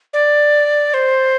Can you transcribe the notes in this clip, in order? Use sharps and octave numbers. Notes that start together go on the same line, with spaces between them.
D5
C5